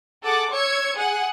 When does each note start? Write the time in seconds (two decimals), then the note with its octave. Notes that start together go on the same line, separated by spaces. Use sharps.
0.23 G#4 A4 F#5 D6
0.52 C#5 E6 G#6 C#7
0.95 G#4 F#5